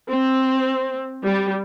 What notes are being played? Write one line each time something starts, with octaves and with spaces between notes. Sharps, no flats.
C4
G3